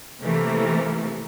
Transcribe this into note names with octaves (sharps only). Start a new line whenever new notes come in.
C3 E3 A3 A#3